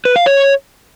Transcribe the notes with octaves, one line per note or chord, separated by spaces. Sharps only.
B4
F5
C#5